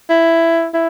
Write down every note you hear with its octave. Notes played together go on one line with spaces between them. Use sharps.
E4
E4